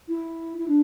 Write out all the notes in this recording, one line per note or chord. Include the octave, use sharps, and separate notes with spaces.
E4
E4
D4